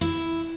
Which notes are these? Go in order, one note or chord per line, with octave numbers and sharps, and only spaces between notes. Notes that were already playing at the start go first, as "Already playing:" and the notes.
E4